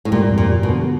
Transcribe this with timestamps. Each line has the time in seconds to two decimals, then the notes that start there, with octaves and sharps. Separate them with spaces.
0.05 A2
0.12 A#2 G3
0.31 F2
0.38 A#2
0.50 G3
0.63 B2
0.70 D3